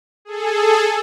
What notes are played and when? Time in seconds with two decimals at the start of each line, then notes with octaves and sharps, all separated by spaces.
0.25 G#4 A4